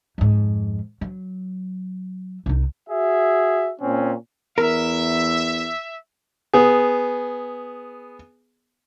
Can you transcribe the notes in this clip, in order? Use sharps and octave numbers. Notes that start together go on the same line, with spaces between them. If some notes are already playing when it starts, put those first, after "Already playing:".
F2 G#2
F#3
C2 D#4
F#4 G#4 E5
A#2 C4 C#4
E2 A#4 E5
B3 G#4